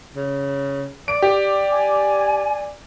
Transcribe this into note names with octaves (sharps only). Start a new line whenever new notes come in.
C#3
D5 D7
G4
G#5